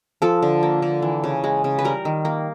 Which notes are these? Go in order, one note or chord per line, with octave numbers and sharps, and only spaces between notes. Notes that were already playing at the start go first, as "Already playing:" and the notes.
F3 A4
D3
A#3
D3
E3
C#3
G#3
C#3
B4
G3 A#4
D#3
A#3